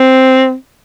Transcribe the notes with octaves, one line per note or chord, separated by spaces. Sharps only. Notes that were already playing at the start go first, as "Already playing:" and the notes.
Already playing: C4